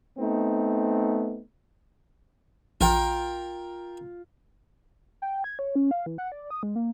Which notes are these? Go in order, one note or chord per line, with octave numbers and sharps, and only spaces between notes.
A3 B3 C4 D#4
A#1 F4 A#4 G5
G5
G#6
C#5
C#4
F5
E3
F#5
D5
D#6
G#3
A#3